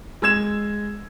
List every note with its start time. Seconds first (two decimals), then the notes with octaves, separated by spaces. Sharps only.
0.22 G#3 E6 G#6 E7